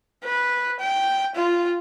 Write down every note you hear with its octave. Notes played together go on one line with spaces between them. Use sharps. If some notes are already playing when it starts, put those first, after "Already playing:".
B4
G5
F4